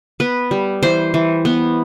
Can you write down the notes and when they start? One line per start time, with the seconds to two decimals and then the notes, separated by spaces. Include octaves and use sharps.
0.20 B3 B4
0.51 G3
0.83 E3 C5
1.14 E3
1.45 B3